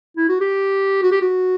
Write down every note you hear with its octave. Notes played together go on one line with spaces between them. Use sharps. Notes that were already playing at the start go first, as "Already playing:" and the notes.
E4
F#4
G4
F#4
G4
F#4